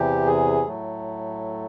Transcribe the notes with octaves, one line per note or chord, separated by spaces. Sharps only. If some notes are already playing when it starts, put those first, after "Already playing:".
Already playing: E2 C3 E3 G4
G#4
A2 F#3 A3